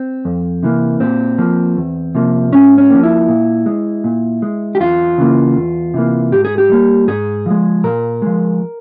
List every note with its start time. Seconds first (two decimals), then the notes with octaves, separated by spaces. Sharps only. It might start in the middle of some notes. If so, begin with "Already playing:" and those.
Already playing: C4
0.25 F2
0.63 C3 E3 A#3
1.00 A#2 C4
1.38 F3 A#3
1.77 E2
2.15 C3 F3 A#3
2.52 G#2 C#4
2.78 C#4
2.90 F3 A#3
3.03 E4
3.28 A#2
3.66 G#3
4.04 A#2
4.42 G#3
4.75 G4
4.80 E2 F4
5.18 C#3 E3 G3 A#3
5.56 E2
5.94 C3 E3 A#3
6.32 G#2 G4
6.45 G#4
6.58 G4
6.70 G3 A#3
7.08 G#2 G#4
7.46 F3 G#3
7.84 A#2 A#4
8.22 F3 G#3